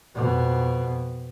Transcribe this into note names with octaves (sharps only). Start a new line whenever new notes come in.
F2 B2